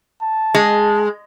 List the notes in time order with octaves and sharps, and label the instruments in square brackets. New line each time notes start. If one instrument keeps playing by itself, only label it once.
[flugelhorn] A5
[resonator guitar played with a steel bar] G#3